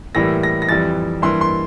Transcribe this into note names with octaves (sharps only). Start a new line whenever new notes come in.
A2 E3 G3 A#3 A#6
A#6
A#6
F2 E3 G3 A6
G2 E3 A#3 C6
C6